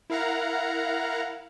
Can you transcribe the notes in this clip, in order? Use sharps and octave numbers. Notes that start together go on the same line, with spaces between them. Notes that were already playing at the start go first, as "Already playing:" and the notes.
E4 A#4 F5 F#5 A#5